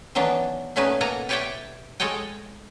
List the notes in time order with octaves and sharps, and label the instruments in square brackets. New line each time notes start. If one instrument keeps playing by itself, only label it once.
[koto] D#3 E3 F#3 B3 D4
A#2 F#3 A3 C#4 D#4 B4
B2 A#3 A4 F#5 G#5 A#5
G4 B4 C#5 D5 E5 G5
G#3 A4 C#5 D#5 G5